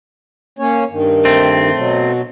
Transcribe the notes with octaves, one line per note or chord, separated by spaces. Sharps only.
A#3 C#4 C#5
G2 D#3
A3 C4
B2 F#3